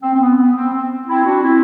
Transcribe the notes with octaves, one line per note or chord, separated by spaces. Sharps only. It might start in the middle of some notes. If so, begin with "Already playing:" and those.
C4
C4
B3
B3
C4
C4
C4 E4
D4 F#4
C4 E4